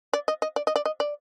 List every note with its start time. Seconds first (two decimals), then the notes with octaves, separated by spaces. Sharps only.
0.13 D5
0.28 D#5
0.42 D#5
0.56 D5
0.67 D#5
0.76 D5
0.86 D#5
1.00 D5